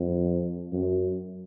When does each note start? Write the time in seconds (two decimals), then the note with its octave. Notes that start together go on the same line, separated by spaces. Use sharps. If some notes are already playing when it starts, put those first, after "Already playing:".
Already playing: F2
0.72 F#2